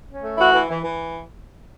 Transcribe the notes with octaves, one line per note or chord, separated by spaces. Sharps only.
C#4
A3
E3 E4 F#4
E3
E3
E3